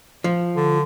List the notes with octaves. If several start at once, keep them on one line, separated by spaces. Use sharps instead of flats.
F3
D3